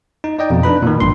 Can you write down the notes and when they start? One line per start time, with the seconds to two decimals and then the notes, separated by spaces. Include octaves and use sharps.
0.24 D#4
0.38 D#4 D5 D#5 G5
0.50 F2 B2
0.63 D4 D#4 B4 B5
0.82 A#2 D#3
1.00 A1 G2 C6